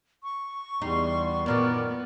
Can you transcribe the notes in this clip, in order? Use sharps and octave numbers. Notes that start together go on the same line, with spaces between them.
C#6
E2 G3 D#4 C6
F#2 A#2 D#3 B3 A#4 D5